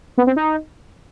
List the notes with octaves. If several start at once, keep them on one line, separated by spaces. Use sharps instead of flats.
B3
C4
D#4